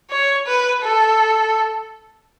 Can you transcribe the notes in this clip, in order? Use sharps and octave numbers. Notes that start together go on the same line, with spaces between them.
C#5
B4
A4